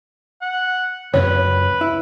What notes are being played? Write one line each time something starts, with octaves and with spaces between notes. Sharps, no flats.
F#5
C#2 F#2 C#4 B4 C#5
E4